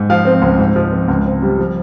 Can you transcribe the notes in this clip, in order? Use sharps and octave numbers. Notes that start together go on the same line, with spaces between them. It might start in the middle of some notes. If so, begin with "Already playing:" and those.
Already playing: G#2
F3 F5
C4
C#2
G#2
F3
C4
C#2
C4
G3
F3